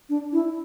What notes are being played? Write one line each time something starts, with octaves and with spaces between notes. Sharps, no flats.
D4
E4